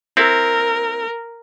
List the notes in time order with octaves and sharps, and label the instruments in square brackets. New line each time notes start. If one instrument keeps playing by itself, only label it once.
[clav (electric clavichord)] C4 E4 [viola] A#4